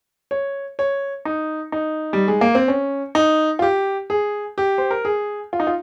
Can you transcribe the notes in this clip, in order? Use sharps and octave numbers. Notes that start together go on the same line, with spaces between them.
C#5
C#5
D#4
D#4
G3
G#3
A#3
C4
C#4
D#4
F4
G4
G#4
G4
C5
A#4
G#4
F4
D#4
F4